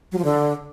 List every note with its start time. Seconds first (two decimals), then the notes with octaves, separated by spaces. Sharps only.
0.12 F#3
0.18 F3
0.24 D3